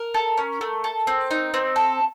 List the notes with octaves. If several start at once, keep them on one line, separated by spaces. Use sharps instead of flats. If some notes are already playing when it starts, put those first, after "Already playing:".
Already playing: A#4
A4
C#4
A3
A4
C4
D#4
C4
A4